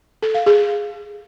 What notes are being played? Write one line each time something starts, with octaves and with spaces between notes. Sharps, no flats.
A4
F5
G#4